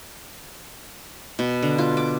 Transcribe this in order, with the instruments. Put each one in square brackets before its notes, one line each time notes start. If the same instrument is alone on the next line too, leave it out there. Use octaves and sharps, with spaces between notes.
[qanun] B2
D3
F4
D6